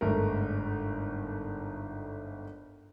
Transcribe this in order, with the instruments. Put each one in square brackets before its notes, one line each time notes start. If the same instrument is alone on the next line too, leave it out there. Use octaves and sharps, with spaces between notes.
[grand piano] G1 G#2 A3 A#4